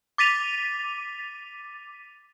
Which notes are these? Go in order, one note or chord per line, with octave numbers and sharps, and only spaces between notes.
D6 A6 B6 D#7 F7